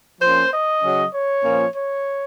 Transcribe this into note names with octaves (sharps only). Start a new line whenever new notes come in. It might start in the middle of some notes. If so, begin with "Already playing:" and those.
F3 A#3 C#4 C5
D#5
C#3 F#3 C#4
C#5
A#2 F3 A#3 C#4
C#5